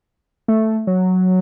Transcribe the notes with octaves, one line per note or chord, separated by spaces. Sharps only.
A3
F#3